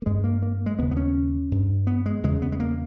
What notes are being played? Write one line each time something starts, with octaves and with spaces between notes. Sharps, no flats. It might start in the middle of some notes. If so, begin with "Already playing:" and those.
A#3
G2 G#3
A#3
A#3
G#3
D#2 C#3 B3
B3
C#4
G2
B3
G#3
E2 C#3 G#3
B3
G#3
A#3